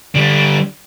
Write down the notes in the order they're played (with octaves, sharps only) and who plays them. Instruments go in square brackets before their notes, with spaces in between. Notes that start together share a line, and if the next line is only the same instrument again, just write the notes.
[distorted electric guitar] D3 G3